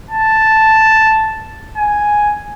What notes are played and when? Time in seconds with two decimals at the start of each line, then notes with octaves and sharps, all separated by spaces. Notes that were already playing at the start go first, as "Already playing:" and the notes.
0.11 A5
1.77 G#5